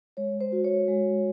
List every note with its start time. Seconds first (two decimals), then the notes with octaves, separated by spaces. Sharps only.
0.17 G#3 C#5
0.41 C5
0.52 F#4
0.64 C#5
0.88 G#3